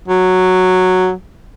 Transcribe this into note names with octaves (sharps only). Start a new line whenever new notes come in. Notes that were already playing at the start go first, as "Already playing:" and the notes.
F#3